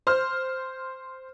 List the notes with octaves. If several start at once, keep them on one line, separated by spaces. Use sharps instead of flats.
C5 F6